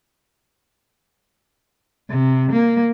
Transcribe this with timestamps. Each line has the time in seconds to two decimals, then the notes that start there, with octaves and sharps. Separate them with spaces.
2.10 C3
2.52 A#3